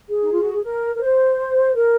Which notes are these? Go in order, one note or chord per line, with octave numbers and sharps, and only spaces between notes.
G#4
D#4
F4
F#4
G#4
A#4
A#4
C5
A#4